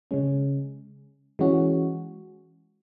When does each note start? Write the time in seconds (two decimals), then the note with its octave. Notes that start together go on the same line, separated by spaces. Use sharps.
0.11 C#3 G#3 C#4
1.39 E3 G#3 C#4 F#4